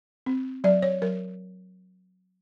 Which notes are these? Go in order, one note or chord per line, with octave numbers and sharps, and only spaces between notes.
C4
F#3 D5
C#5
F#3 A#4